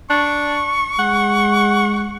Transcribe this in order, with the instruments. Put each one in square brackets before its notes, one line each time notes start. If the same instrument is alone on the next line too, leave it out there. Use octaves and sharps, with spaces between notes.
[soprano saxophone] D4 [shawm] C#6
[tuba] G#3 [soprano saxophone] F#5